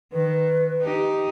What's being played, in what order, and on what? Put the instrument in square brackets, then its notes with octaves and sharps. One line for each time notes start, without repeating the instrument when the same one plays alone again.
[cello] D#3 [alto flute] B4
[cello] D#4 G4